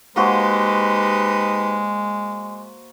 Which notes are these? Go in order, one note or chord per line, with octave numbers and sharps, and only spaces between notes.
G#3 A#3 D#4 F#4 G4 B4 C5